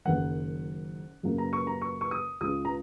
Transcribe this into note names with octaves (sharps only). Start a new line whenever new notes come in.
F#1 F#2 D#3 F#5
F#2 C#3 A#3
A#5
C#6
A#5
C#6
C#6
D#6
C#2 C#3 G#3 D#6
A#5